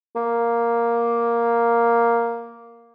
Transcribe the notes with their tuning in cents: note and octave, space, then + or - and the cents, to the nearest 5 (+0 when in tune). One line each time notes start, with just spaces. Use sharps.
A#3 +5